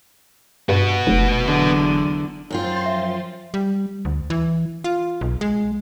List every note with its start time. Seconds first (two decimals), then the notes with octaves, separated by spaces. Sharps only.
0.69 G2 B3 F#4
1.07 F1
1.43 E2 D3 F#3
2.51 F#2 C4 F4 C5 C6 A6
2.86 F3 E5
3.54 G3
4.05 D2
4.30 E3
4.84 F4
5.21 B1
5.41 G#3